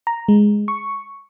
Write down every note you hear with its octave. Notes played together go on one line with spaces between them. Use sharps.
A#5
G#3
C#6